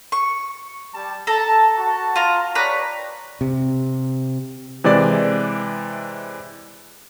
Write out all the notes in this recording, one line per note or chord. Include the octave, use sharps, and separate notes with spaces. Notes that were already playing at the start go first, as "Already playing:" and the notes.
C#6
G3 A5
A4 A5 A#5
F#4 A5
F4 A#5
G4 B4 C#5 D5 A#5 F#6
C3
C3 E3 G#3 D5 D6